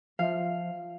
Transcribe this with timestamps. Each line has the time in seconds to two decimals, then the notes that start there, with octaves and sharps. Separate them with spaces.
0.19 F3 F5